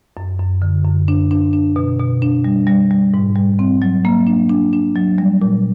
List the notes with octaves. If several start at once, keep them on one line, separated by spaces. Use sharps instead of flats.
F#2
F#2
D3
F#2
D4
D4
D4
B2
B2
D4
G3
G3
G3
G#2
G3
C4
F#3
A#3
D4
D4
D4
F#3
G3
A#2